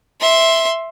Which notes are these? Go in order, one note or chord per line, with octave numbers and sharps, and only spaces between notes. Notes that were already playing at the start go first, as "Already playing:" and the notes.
E5 C6